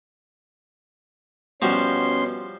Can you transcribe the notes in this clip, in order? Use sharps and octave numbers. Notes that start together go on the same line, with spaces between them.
B2 F3 G3 C#4 F#4 C6